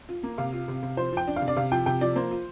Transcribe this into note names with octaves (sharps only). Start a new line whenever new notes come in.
F4
A#3
C3 F5
F4
C3
C3
F3 C5
F3 G5
D4
F5
C3
D5
C3 F5
F3 G5
C3 G5
F3 D5
A#3 C5
F4